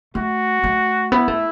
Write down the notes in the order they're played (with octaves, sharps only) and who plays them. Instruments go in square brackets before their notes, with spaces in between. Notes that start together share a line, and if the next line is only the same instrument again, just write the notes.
[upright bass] A3 [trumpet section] F#4
[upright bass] A3
[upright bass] B3 [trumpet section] E4
[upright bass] A3